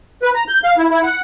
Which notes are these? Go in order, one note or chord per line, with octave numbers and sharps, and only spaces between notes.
B4
A#5
G6
F5
E4
E4
F#5